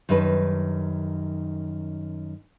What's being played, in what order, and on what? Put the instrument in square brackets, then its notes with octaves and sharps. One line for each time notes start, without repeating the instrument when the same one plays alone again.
[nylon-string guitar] F#2 D#3 G3 D#4 B4 A5